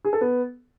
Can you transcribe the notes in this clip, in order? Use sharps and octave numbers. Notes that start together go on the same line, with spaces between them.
G#4
A4
B3